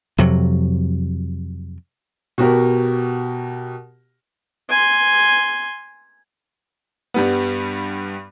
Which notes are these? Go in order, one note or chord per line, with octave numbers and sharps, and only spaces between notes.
F2 C3 F#3
B2 F#4 G4 A#4
G#5 C6
G2 G3 B3